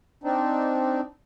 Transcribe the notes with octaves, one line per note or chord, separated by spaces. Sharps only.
C4 D4 D#4